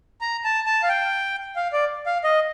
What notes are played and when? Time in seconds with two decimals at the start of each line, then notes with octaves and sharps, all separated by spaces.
0.21 A#5
0.44 A5
0.66 A5
0.83 F5
0.89 G5
1.56 F5
1.73 D5
2.06 F5
2.24 D#5